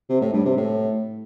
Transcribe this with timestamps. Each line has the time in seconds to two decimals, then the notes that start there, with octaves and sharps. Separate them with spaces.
0.09 C3
0.21 A2
0.33 G2
0.45 C3
0.57 A2